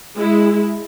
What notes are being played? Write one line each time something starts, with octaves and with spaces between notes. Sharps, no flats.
G#3 E4